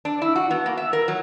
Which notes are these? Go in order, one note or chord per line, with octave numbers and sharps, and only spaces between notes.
D4
E4
F#4
B3
A#3
E5
A#4
F#3